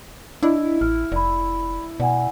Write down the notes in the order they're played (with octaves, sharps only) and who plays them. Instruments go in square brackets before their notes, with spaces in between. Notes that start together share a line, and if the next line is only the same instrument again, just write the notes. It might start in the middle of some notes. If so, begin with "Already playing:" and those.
[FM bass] D4 [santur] E4 [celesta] D#5
[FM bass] A1 [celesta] F6
[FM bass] F1 [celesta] D5 B5
[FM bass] B2 [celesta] D5 F#5 G#5